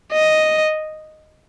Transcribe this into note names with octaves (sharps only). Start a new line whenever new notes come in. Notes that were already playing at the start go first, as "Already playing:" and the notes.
D#5